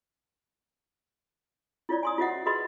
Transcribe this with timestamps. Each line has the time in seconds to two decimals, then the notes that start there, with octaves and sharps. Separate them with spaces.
1.89 E4 F4 C#5 D5
2.03 G#5 C6 D#6
2.18 F4 F#4 C5 D#5 E5 F#5
2.46 F#4 G#4 B4 D#5 B5 C6